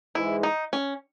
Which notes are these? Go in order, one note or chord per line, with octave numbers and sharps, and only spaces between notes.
G#2 E3 G#3 E4
D#4
C#4